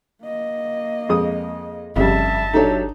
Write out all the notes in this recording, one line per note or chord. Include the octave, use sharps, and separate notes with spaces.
A#3 D#5
F2 G#3 D#6
G1 F2 C#3 G3 E5 A5
F#3 D4 D#4 G4 A4